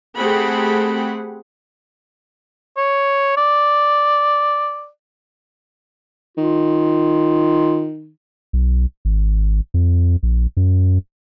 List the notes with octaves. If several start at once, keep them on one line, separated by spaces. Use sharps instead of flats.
A3 C4 G4 G#4 F#5 B5
C#5
D5
D#3 F4
B1
G#1
F2
A#1
F#2